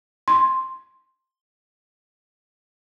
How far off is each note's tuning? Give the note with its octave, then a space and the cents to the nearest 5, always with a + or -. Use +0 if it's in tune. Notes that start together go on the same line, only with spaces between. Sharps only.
C6 +5